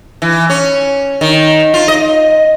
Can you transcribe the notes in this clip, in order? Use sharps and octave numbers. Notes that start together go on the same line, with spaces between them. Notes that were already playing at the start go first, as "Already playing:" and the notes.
E3
C#4
D#3
F4
D#5